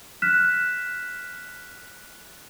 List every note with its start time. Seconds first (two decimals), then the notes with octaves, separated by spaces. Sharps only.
0.22 F6 F#6 B6 E7